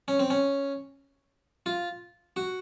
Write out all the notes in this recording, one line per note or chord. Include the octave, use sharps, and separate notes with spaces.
C#4
C4
C#4
F4
F#4